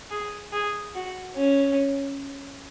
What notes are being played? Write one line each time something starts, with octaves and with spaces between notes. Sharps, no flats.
G#4
G#4
F#4
C#4